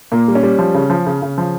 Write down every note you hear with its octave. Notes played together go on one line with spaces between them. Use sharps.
A#2 A#3
G3
C#4
G3
F3
C#3
F3
C#3
C#3
F3